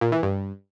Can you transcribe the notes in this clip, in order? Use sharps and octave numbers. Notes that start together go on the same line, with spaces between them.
A#2
E3
G2